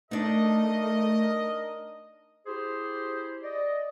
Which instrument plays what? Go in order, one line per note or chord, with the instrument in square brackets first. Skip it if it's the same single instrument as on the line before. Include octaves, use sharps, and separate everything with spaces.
[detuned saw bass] A3 [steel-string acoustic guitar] D4 D#4 [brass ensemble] A#4 D#5
[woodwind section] E4 G4 G#4 C5
D5 D#5